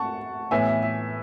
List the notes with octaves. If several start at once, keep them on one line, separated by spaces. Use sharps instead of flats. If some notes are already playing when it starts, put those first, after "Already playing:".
Already playing: F#5 A5 C#6
A2 E3 B3 E5 G#5
E5
E5